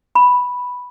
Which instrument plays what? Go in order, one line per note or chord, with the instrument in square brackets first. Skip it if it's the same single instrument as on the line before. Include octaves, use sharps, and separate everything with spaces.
[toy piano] B5